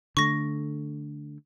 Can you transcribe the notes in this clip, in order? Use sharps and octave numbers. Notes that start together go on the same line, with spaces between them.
D3 A3 C#6 A#6